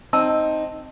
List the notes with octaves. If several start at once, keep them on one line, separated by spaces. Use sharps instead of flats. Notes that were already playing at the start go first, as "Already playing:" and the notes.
C4 D#4 A5 E6